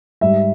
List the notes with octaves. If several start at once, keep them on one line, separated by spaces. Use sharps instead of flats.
G#2 G3 E5